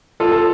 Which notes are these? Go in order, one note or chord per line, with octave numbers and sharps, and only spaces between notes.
F4 A4
A4